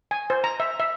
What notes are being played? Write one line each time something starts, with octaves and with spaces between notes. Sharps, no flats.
G#5
C5
A#5
E5
E5